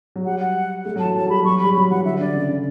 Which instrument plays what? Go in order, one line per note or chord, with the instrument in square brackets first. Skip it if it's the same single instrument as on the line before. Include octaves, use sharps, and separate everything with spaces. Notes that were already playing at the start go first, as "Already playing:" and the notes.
[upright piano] F#3
[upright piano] G3 [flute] F#5
[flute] F#5
[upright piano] A3
[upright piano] F#3 [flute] A5
[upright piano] E3
[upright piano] F#3 [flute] A5
[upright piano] F#3
[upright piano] G3 [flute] B5
[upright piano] F#3 [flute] C#6
[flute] B5
[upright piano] G3
[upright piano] F#3 [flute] B5
[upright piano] E3 [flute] F#5
[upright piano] D3 [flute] E5
[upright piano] D3 [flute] D5
[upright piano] C#3
D3